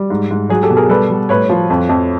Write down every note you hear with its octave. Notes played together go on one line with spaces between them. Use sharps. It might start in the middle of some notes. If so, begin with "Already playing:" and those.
Already playing: G3
G#2
G#2
F#3 G#4
G4 A4
B2
G#4 A#4
G3 A4 B4
G3
A2 B4 C#5
F3
F2
F2